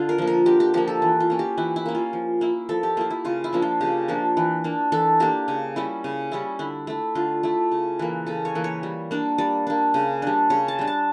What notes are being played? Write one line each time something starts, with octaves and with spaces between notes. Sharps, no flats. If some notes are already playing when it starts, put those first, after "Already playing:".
Already playing: D3 F4
A#4
F3 A#3
A#4
D3 G4
G4
F3 A#3 G4
A4
E3
F4
A#3 C#4
G4
E3 E4
E4
A#3 C#4
F4
F3
A#3 E4
F3 A4
G4
A#3 E4 F4
E4
C#3 F4
E4
F3 A#3 D4
F4
C#3 G4
F3 A#3 D4
E3
A#3 D4
E3 A4
A#3 D4 G4
C#3
G3 C#4 E4
C#3
G3 C#4 E4
D3 E4
A3 E4
D3 F4
A3 E4
C#3
E3 A#3
C#3 A4
C#5
E3 A#3
C#5
G3
A#3 D4
G3 D5
A#3 D4
C#3
G3 D4
C#3 C#5
A5
G3 D4
A5